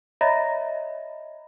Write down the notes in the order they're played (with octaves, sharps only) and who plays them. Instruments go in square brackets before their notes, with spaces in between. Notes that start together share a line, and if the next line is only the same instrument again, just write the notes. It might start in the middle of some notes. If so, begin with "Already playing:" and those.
[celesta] C#5 D#5 E5 A#5 B5 A#6